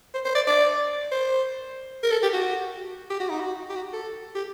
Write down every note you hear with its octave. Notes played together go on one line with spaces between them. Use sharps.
C5
C5
D5
D5
C5
A#4
A4
G4
F#4
G4
F#4
D#4
F#4
G4
F#4
A4
G4